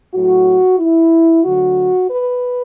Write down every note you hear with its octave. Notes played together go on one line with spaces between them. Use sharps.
A2 F#3 F#4
E4
D2 D3 F#3 F#4
B4